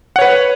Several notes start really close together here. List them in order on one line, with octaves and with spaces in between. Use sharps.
F#5 C#5 B4